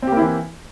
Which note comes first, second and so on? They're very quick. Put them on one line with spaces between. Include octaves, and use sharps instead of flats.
C4 G4 A#3 E4 E3